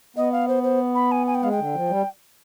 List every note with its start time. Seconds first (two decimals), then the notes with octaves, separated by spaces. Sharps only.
0.16 B3 D#5
0.32 F5
0.48 C5
0.63 C5
0.95 B5
1.11 G#5
1.27 G#5
1.35 G5
1.43 G#3 F5
1.52 G5
1.59 D3
1.75 F3
1.90 G3